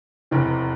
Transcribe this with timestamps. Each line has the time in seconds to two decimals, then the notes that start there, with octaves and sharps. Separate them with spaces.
0.31 F1 E2 E3